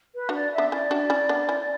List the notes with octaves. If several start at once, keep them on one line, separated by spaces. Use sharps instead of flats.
B4
D4 F#4
D5
E5
B3 D4
C#4 E4 D5
D4 F#4
C#4 E4
B3 D4
C#4 E4